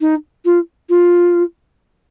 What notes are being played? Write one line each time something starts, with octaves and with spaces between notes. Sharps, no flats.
D#4
F4
F4